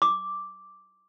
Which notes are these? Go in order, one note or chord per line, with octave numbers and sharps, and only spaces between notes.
D6